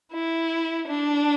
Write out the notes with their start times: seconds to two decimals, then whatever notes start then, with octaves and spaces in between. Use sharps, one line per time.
0.12 E4
0.88 D4